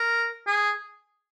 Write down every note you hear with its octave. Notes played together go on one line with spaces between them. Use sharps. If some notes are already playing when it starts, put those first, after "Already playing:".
Already playing: A#4
G#4